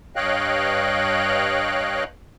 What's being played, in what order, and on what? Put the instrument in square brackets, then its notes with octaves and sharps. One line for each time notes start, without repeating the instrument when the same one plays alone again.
[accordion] G2 C#5 D#5 F5 G5 F#6